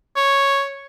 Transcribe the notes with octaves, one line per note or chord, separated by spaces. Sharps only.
C#5